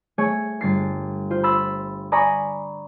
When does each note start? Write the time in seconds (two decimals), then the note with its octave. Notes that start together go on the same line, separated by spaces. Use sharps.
0.18 A3 G#4 C#5
0.61 G1 A6 C7
1.31 F4 C5
1.43 B5 C6 E6 A6
2.12 D5 G#5 A#5 B5 C#6 D#6